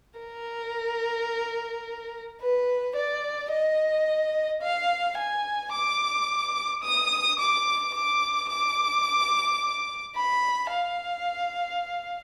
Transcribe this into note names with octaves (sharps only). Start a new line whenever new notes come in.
A#4
B4
D5
D#5
F5
G#5
D6
D#6
D6
D6
D6
B5
F5